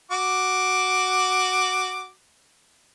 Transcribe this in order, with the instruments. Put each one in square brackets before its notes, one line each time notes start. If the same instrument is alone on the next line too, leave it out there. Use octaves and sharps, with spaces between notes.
[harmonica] F#4 D6